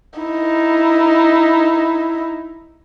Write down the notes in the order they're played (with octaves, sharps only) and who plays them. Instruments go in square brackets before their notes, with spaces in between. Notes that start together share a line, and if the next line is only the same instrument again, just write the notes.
[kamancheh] D#4 E4